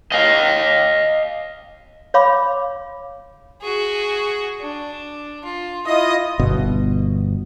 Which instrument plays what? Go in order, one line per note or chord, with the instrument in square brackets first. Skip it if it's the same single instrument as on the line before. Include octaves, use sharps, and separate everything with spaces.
[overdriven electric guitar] D#5 F5
[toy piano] C#5 F5 B5 D6
[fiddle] F#4 G#4
D4
F4
[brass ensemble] E4 F4 D#5 [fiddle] D#6
[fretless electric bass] G1 B2